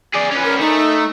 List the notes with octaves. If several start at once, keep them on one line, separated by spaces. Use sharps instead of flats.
G#4 D5
C#4 B4
A#4
A3 D#4